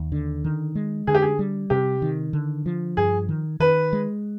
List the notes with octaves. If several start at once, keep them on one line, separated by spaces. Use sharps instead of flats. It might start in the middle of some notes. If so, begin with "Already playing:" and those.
Already playing: D#2
D3
D#3
G#3
D3 G#4
G4
G#4
G3
C3 G4
D#3
D3
F3
G2 G#4
D#3
D#3 B4
G#3